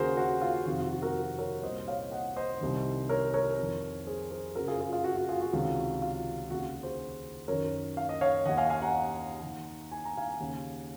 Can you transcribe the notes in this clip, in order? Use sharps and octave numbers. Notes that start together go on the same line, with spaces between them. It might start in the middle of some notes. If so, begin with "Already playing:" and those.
Already playing: D#2 C#3 F#4 G#4 A#4 C5
F#4
F4
F2 C3 D#3 F#4
F4
F#4
F#4 A#4
A#4 C#5
C2 A#2 C5 D#5
C#5 F5
D#5 F#5
C5 D#5
C2 C3 D#3
A#4 C#5
A#4 C#5
F2 D#3
G#4 C5
G#4 C5
F#2 C#3 F#4 A#4
F4 G#4
F4 G#4
F4 G#4
F#4
F#4
F4 G#4
F#4
C#2 C3 D#3
F4
D#2 C#3 F#4
F#4
G#4 C5
F#2 D#3 A#4 C#5
F5
D#5
C#5 F5
D#2 D#3 D#5 F#5
F5 G#5
F5 G#5
F#5 A#5
D#2 D#3
G#5
A#5
F5 G#5
D#2 C#3